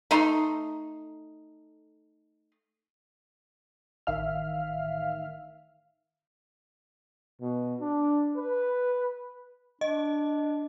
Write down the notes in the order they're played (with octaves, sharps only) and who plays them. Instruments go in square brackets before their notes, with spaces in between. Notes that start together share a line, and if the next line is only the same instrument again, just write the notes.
[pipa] A3 D#4 C6
[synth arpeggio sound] A1 D#3 E5 F5 F6
[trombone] B2
D4
B4
[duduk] D4 [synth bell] D#5